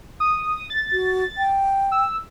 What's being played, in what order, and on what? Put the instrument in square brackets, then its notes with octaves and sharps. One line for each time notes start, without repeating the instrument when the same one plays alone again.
[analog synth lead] D#6
A6
[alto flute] F#4
G5
[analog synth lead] E6